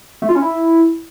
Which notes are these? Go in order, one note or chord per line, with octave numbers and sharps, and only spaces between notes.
A3
F4
C#4
E4